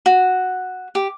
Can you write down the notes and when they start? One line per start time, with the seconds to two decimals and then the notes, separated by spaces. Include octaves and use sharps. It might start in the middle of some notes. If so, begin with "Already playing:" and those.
0.06 F#4
0.95 G4